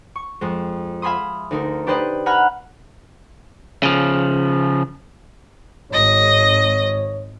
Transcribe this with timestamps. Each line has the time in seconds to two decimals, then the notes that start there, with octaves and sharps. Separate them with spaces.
0.16 C#6
0.41 F2 G#3
1.02 E5 F5 G#5 B5 C6 D#6
1.51 D2 D#4 A#4
1.87 D4 G4 B4 C5 D5 D#5
2.26 F#5 G#5 A#5 B5 F6 F#6
3.83 C#3 F3
5.92 G#1 C#5 D#5